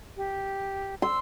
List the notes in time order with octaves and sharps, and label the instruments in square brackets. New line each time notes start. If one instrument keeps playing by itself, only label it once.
[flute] G4
[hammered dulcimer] C6 [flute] E6